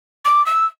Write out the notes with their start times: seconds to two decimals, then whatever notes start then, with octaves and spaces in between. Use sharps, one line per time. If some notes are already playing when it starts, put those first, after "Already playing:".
0.25 D6
0.46 E6